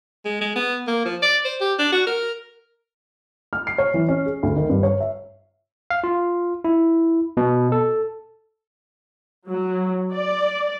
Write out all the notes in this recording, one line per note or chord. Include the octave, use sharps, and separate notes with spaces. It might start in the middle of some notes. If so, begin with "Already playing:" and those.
G#3
G#3
B3
A#3
F3
D5
C5
G4
D4
F#4
A#4
F6
C7
C#5
E3
C#4
G#4
D2
D#3
G2
C#5
E5
F5
F4
E4
B2
A4
F#3
D5